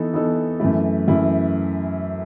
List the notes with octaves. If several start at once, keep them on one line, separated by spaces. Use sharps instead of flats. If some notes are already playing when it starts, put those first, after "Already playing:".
Already playing: E3 B3 D#4 A4
E3 B3 D#4 A4
F#2 E3 A3 E4
F#2 E3 A3 E4